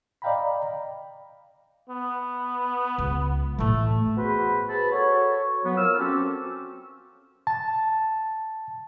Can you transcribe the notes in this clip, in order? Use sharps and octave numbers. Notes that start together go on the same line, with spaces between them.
D5 D#5 F5 G5 A#5 B5
B3
C#2
A1 A2 A3
B3 F#4 G#4 B4 C5
G#4 B4 C5 A5 B5
F#4 A4 C#5
F#3 B3
F3 A#4 E6 F6
C4 C#4 F#4 G4 A4
A5